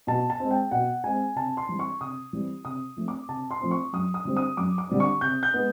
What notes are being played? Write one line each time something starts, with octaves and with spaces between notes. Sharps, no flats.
B2 A5
A5
G#3 C4
G5
B2 F#5
G#3 C4 G#5
C3 A5
C6
E3 G3 C4
C#6
C3 D#6
E3 G3 C4
C3 D#6
F3 A3 C4
D6
C3 A5
C6
F3 A3 C4
C#6
F#2 D#6
D#6
D3 G3 C4
D#6
F#2 D6
D6
D3 G3 C4
C#6
C3 G6
G6
G#3 B3